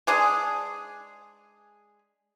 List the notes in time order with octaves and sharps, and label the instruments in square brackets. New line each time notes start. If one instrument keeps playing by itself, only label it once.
[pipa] G#3 D4 G#4